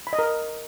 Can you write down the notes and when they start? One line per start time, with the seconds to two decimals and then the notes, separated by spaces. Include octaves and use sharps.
0.07 B5
0.13 D#5
0.19 A#4